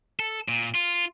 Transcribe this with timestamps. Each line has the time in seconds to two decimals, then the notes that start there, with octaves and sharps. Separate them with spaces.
0.20 A4
0.48 A#2
0.75 F4